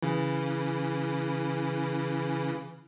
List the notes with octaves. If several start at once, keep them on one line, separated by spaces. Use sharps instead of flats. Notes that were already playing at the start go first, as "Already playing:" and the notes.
C#3 E3